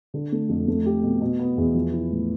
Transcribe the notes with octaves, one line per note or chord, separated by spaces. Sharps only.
D3
A3
F2
A3
G4
B2
B2
B3
E2
F3
E4
A2